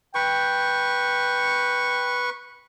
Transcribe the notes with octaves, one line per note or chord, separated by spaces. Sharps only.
B4 G5 C#6